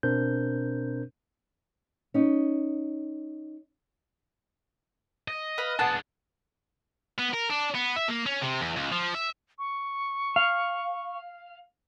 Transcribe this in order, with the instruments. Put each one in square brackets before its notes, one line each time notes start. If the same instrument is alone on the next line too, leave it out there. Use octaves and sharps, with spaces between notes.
[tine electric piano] B2 C4 D4 A#4 C5 G6
[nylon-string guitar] C#4 D#4
[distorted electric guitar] D#5
[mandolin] B4 F5 F#6
[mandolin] B3 F#5 A5 [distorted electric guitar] D4 G#4
[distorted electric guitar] B3
A#4
D4
B3
E5
A#3
C#4
C3
E2
C#2
F3
E5
[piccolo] C#6
[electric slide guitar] F5